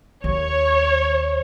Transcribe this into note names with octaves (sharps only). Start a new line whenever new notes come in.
D#2 C#5